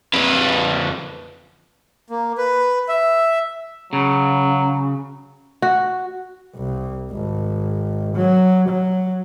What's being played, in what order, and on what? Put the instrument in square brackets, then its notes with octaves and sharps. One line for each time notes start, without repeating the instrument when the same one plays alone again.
[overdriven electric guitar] F2 B4
[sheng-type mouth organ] A#3
B4
E5
[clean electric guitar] C#3 [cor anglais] F#3
[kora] F#4
[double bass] C2
G#1
F#3
F#3